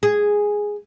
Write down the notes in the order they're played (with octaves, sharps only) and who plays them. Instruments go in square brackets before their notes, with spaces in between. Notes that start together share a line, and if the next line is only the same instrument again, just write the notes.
[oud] G#4